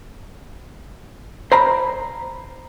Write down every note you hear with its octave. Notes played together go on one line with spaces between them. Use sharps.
C5 A#5 B5